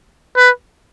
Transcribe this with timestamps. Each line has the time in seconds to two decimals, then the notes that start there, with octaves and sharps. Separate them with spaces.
0.37 B4